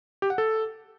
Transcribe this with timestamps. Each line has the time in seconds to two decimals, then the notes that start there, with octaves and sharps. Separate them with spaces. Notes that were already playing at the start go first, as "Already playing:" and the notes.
0.22 G4
0.30 F#5
0.38 A4